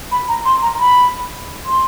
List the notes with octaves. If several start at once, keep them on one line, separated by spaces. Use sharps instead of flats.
B5
A#5
C6
A#5
B5
C6